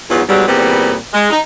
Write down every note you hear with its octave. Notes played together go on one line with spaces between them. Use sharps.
E2 G#2 F#3 B3 F4
G#2 B2 F#3 G3
E2 A#2 G3 B3 C4
G#3
D#4